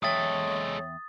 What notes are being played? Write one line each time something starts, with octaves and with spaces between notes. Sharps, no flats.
E2 G#3 A4 C#5 E5 G5 D#6 A6